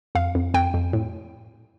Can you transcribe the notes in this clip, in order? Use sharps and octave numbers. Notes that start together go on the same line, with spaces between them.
F2 F5
F2
F2 G5
F2
A2